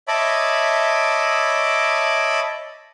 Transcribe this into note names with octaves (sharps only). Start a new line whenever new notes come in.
C#5 D#5 E5 A5 B5 D6